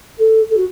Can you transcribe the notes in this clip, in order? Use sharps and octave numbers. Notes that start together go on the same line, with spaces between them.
A4
A4
F#4